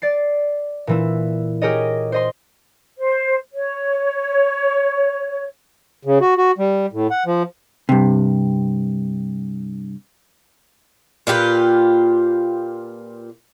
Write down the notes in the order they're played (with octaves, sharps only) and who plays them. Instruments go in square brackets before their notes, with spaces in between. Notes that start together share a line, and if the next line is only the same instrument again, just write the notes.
[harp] D5 A6 C7
A#2 E3 E4
G4 G#4 A#4 C#5 D#5
C5 D#5 C6
[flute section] C5
C#5
[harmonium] C#3
F#4
F#4
G3
A2
F#5
F3
[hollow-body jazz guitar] G2 C3
[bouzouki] A#2 F4 G4 B4